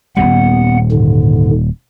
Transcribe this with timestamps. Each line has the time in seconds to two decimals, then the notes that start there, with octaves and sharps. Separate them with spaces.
0.17 D#1 A#2 G3 B3 F#5
0.92 G#2 D3